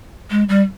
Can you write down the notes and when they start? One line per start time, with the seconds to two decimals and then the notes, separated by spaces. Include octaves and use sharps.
0.30 G#3
0.49 G3